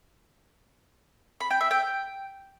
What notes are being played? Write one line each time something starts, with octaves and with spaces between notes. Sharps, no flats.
B5
G5
E5
G5